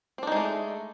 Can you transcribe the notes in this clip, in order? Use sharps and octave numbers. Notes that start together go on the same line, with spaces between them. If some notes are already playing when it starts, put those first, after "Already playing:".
G#3 A3 C4 D4 D#4